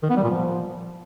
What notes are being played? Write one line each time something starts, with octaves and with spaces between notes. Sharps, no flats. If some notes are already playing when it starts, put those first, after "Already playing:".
D#3
B3
G3
A#2
F3